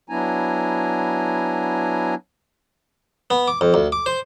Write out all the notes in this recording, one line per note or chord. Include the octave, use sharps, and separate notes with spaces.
F#3 B3 D4 E4 G#5 A#5
B3
D6
F2
D2
D6
C5